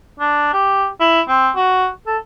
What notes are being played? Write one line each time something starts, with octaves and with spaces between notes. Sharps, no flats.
D4
G4
E4
C4
F#4
A4